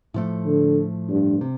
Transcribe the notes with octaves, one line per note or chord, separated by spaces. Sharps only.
A2 F3 A3
D3
G2
C3